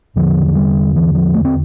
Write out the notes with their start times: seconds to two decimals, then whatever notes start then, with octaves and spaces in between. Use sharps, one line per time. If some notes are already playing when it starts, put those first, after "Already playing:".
0.16 E2 D3 F3
0.46 F3
0.55 G3
0.96 E3
1.15 F3
1.34 A3
1.45 C4